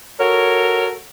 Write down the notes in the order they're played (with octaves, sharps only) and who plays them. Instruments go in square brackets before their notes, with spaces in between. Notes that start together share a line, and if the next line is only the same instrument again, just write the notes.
[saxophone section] F#4 A4 A#4 C#5